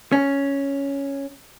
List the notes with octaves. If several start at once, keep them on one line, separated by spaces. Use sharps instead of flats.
C#4